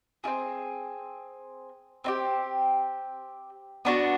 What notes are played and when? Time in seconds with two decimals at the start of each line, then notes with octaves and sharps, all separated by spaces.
0.24 C4 E4 G#4
2.04 C4 D#4 G4
3.85 B3 D4 F#4